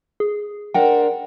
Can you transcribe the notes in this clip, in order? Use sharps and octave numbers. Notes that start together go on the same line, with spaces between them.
G#4
D4 A#4 C5 F#5 G5